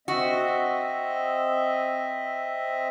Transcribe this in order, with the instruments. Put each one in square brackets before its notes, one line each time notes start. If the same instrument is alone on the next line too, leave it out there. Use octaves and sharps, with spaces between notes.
[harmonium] C4 D#5 E5 [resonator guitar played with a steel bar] F#4